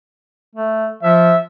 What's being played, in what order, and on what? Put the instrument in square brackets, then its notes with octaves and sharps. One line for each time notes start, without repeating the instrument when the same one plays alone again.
[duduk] A3
[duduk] F3 [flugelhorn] E5